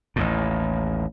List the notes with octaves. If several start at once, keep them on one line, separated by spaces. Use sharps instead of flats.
A1 D#2 A2